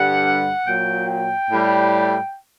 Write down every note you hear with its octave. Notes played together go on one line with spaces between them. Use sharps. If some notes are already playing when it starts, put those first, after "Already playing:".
Already playing: G2 D3 G3 F#5
A#2 F#3 G5
G5
A2 G3